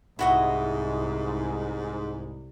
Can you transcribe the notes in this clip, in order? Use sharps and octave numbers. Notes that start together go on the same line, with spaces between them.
C2 G#2 E4 F#4 D#5